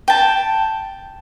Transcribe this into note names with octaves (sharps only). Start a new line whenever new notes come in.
G5 A5